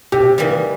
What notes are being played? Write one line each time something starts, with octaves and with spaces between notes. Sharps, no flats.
C3 G4
E3 G3 A#3 D#4